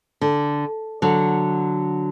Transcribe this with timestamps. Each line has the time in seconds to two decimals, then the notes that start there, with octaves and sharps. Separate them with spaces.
0.21 D3
1.02 D3 F#3